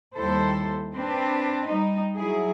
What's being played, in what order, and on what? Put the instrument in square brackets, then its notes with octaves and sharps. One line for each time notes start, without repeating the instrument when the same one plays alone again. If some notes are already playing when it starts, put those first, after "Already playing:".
[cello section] D#2 G3 E4 A4 C5
C4 D4 B4 C5
G3 D#4
F#3 E4 G#4